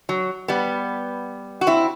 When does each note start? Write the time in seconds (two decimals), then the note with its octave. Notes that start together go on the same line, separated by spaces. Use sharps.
0.09 F#3
0.48 G3 B3
1.61 F#4
1.67 C4 E4